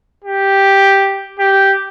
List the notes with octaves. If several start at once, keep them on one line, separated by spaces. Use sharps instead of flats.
G4
G4